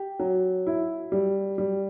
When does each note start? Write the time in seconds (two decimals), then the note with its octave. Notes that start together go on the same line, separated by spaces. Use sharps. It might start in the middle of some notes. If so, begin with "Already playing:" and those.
Already playing: G4
0.19 F#3
0.67 E4
1.12 G3
1.58 G3